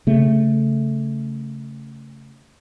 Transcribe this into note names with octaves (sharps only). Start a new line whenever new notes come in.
C#3 A3